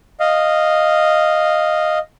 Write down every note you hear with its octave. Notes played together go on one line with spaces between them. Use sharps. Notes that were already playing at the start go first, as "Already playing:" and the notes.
D#5 F5